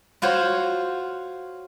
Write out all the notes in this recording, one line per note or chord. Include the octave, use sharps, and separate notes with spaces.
F4 F#4 C5 C#5